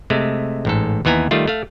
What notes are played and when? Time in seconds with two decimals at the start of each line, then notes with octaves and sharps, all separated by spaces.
0.10 C3 G#3 A3
0.65 A1 G#2 A4
1.05 D#2 E3 B3 G#5 A#5
1.31 D#3 G3 A3 F4
1.48 A3 F5